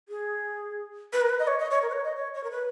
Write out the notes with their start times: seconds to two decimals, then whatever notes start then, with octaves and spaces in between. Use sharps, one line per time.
0.09 G#4
1.13 B4
1.21 A#4
1.29 B4
1.39 D#5
1.47 C#5
1.59 D#5
1.71 C#5
1.82 A#4
1.90 B4
1.93 C#5
2.05 D#5
2.16 C#5
2.34 C#5
2.44 A#4
2.51 B4